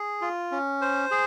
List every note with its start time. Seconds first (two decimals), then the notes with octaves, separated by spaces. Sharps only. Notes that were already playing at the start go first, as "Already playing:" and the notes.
Already playing: G#4
0.21 F4
0.52 C#4
0.81 C5
1.11 G#4